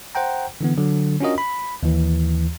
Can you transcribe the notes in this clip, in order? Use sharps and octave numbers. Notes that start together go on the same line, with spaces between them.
C5 F#5 G5 A#5
D3 E3 B3
D3 F#3
C#4 D4 F4 F#4 A#4 D#5
B5
D#2 E3